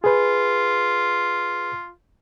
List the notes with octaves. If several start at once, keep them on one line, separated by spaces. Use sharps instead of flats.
F4 G#4 B4